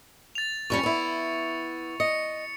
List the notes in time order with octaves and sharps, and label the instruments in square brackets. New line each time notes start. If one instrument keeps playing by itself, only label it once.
[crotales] A6 F7
[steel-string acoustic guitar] F2 G3 C#4 [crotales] C#6 C#7
[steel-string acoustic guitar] B3 E4
[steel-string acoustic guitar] D#5 [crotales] C#7